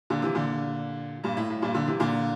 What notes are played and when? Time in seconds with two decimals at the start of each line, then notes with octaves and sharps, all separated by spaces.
0.10 A#2 D3
0.22 C3 E3
0.35 A#2 D3
1.24 G2 A#2
1.37 A2
1.50 A2
1.62 G2 A#2
1.74 A#2 D3
1.87 C3 E3
2.00 A#2 D3